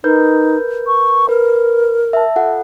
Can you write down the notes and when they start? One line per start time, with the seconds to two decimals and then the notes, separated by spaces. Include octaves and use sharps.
0.04 D#4 A#4 B4 G6
0.87 C#6
1.29 A#4 B4
2.13 E5 A5
2.36 F4 A4 F#5